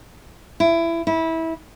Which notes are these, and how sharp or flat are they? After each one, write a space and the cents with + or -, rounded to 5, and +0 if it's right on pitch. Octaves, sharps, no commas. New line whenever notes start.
E4 +20
E4 -20